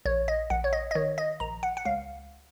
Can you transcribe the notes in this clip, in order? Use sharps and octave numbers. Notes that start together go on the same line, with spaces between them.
A#1 C#5
D#5
A#1 F#5
C#5
D#5
D#5
D#3 C#5
D#5
A#1 A#5
F#5
F#5
C#2 F5